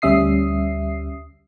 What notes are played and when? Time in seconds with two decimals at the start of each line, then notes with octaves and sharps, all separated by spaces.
0.02 D2 G3 C#4 E5 D#6 C7